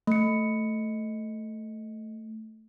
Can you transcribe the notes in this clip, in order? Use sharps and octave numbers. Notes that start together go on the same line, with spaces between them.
A3 C#7